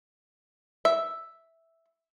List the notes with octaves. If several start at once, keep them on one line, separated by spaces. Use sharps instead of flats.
E5